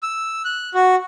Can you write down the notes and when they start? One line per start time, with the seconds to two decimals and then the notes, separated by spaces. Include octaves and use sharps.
0.03 E6
0.45 F#6
0.74 F#4